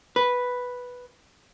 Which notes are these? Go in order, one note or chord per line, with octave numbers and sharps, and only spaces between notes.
B4